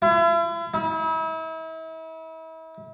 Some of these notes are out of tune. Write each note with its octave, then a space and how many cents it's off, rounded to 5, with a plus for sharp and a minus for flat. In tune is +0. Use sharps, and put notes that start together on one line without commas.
E4 +40
E4 -40